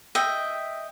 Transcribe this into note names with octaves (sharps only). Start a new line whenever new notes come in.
D#5 E5 G5